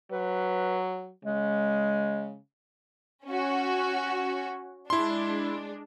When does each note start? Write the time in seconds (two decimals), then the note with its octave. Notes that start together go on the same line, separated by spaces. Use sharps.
0.12 F#3 B4
1.25 C#3 G#3
3.27 C#4 F#4
4.90 G#3 D4 E4 C6